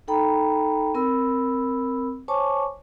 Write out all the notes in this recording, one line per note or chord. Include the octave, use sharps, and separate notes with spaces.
D#4 A4 G5 A#5 B5
C4 A#4 B5 E6
C5 C#5 G#5 A5 C#6 D6